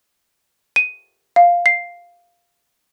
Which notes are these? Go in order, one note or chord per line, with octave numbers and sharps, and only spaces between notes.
D#7
F5
C7